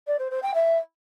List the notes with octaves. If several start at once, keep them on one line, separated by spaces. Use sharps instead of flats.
D5
C5
C5
G5
E5